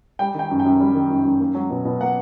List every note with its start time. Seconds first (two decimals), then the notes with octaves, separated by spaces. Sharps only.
0.19 G3 G5
0.34 D#3 G5
0.50 F#2
0.60 G5
0.65 F#2
0.80 G3
0.95 D#3
1.10 F#2
1.25 F#2
1.40 A#3
1.55 F#3
1.70 B2
1.85 B2
2.01 A#3 F#5